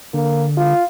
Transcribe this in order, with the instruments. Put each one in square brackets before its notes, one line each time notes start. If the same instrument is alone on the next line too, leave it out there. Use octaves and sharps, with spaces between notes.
[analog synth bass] D3 [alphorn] A#3
[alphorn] F4